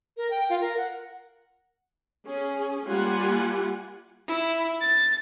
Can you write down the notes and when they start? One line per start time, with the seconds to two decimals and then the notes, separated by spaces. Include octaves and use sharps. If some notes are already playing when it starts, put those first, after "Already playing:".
0.17 A#4
0.30 G5
0.50 F4
0.61 A#4
0.77 F#5
2.26 C#4 G#4
2.87 G3 A#3 F4 G4 F#5 G#5
4.28 E4
4.81 A6